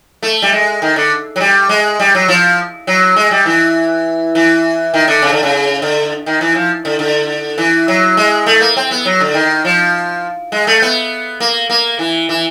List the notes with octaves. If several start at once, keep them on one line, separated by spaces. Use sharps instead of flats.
A3
G3
G#3
D#3
D3
F#3
G3
G#3
G3
F#3
F3
F#3
G#3
G3
E3
E3
D#3
D3
C#3
D3
C#3
D3
D#3
E3
F3
D3
D3
E3
F#3
G#3
A3
A#3
C4
B3
F#3
D3
D#3
F3
G#3
A3
B3
A#3
A#3
E3
E3